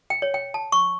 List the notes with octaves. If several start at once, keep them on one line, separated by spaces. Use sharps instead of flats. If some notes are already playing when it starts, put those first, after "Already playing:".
G5
C#5
G5
A5
C#6